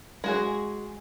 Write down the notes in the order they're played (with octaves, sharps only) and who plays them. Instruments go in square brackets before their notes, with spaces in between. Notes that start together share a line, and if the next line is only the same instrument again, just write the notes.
[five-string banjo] G#3 F#4 G#4